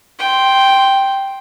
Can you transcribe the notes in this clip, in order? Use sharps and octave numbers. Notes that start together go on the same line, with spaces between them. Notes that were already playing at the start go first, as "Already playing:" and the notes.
G5 C6